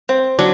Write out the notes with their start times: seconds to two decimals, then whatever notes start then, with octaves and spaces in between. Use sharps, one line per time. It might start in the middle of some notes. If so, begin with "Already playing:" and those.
0.09 C4
0.39 F#3 D4